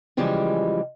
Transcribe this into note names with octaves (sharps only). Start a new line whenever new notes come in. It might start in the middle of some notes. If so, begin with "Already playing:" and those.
C#3 E3 F3 G3 G#3 G4